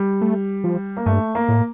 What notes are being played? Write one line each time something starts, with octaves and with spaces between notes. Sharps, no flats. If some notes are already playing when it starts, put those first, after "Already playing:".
Already playing: G3
A3
F3
A#3
G2 A3
A#3
A2